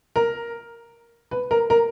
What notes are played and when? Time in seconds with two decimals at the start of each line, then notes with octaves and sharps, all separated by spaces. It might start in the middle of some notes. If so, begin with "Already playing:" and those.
0.16 A#4
1.31 B4
1.51 A#4
1.70 A#4